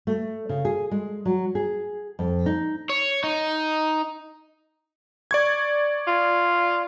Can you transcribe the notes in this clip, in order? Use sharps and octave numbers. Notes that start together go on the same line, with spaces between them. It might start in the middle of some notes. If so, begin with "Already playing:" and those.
A3
C#3
G#4
G#3
F#3
G#4
F2
D#4
C#5
D#4
D5 C#6 G#6
F4